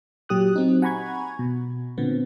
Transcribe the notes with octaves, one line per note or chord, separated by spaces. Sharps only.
A#2 F#3 G4 D#6 F#6
F#3 C4 D#4
F#5 G#5 A#5 B5 C#6 G#6
B2
A#2 D3 B3 C4